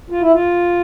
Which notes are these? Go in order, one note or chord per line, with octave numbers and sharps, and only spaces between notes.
F4
E4
F4